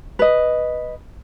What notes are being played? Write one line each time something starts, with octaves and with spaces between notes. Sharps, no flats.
B4 D#5